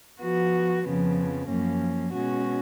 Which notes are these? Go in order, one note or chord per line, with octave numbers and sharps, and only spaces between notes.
F3 B3 F#4
F2 C#3 F3 B3
F#2 F3 A#3 C#4
B2 G#3 C#4 F#4